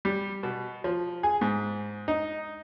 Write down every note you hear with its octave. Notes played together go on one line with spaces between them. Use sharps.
G3
B2
F3
G#4
G#2
D#4